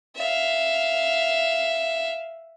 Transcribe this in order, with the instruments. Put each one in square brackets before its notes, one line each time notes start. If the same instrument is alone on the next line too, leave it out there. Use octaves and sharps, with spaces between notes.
[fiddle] E5 F5